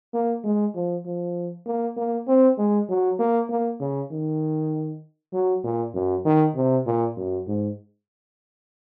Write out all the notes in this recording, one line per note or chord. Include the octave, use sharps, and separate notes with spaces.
A#3
G#3
F3
F3
A#3
A#3
C4
G#3
F#3
A#3
A#3
C#3
D#3
F#3
A#2
F#2
D#3
C3
A#2
F#2
G#2